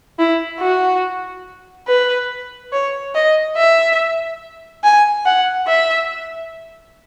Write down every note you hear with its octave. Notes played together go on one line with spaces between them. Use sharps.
E4
F#4
B4
C#5
D#5
E5
G#5
F#5
E5